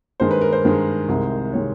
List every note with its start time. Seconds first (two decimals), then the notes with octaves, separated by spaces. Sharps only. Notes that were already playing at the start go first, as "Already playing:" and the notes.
0.20 G2 D#3 G#3 C5
0.31 B4
0.41 A#4
0.53 C5
0.64 G2 D#3 G#3
1.08 C2 C3 D#3 G#3
1.53 C3 D#3 G#3 C#5